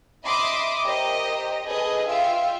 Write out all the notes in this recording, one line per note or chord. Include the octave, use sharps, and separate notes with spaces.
D#5 E5 B5 C6 D6 D#6
G4 A#4 C5 D#5
G#4 A4 B4 D#5
F4 E5 F5 G5